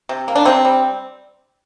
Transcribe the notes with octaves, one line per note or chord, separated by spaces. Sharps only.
C3
A#3
D4
C3 C4
G3